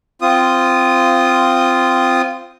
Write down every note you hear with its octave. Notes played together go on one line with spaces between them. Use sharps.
C4 F4 D#6